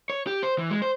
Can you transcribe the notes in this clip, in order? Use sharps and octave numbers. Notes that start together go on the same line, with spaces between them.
C#5
G4
C5
E3
G#3
C5